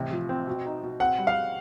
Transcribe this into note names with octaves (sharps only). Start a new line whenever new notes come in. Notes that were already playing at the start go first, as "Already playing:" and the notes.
Already playing: A1 C3
F3
C4
B2
D#4
B2
C4 F#5
G3
F5